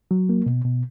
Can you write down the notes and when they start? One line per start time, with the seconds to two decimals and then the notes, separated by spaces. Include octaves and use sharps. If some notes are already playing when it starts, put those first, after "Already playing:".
0.11 F#3
0.29 A#3
0.46 B2
0.65 B2